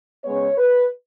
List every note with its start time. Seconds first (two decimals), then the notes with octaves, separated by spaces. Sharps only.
0.24 C#3 G#3 B3 C#5
0.58 B4